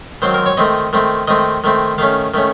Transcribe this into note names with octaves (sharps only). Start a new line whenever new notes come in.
D#3 F#3 C4 C5
A#4
C#5
D#3 A3 C4 D#5
D#3 A3 C4
D#3 A3 C4 D#5
D#3 A3 C4
D#3 A3 C#4 F5
D#3 A3 C#4